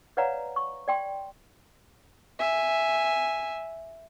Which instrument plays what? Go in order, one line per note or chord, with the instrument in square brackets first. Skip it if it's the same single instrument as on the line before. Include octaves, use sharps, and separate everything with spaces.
[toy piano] B4 C#5 D5 F5 F#5 A#5
C#6
D5 G5 C6
[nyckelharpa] E5 G#5